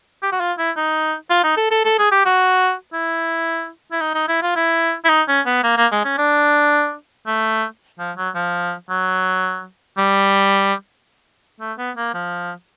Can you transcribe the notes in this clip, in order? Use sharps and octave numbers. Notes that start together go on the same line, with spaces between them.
G4
F#4
F4
E4
D#4
F4
D#4
A4
A4
A4
G#4
G4
F#4
E4
E4
D#4
D#4
E4
F4
E4
E4
D#4
C#4
B3
A#3
A#3
G#3
C#4
D4
A3
F3
F#3
F3
F#3
G3
A3
B3
A#3
F3